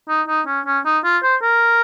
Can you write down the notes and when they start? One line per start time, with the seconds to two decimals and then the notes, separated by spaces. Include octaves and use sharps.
0.09 D#4
0.28 D#4
0.47 C#4
0.66 C#4
0.85 D#4
1.04 F4
1.23 C5
1.42 A#4